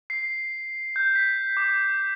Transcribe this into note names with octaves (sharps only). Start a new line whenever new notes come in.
C7
G6
B6
D6